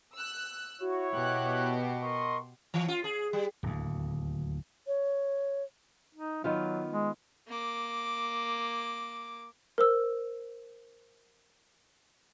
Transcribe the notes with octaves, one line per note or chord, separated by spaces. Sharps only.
E6 F#6
E4 F#4 C#5
B2 F#4 G4 F#6
A#4 D#5 C6 C#6
E3
F4
G#4
G3
D1 D#2
C#5
D#4
D#3 F#3 B3 F4
G#3
A#3 D6
A#4 C5 E6